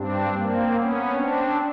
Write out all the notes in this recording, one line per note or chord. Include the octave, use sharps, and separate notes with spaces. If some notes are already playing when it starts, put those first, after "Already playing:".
Already playing: G2 C4 D4
A#3 C4
B3 C#4
C4 D4